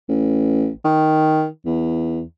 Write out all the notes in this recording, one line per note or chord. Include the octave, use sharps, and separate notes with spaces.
A1
D#3
E2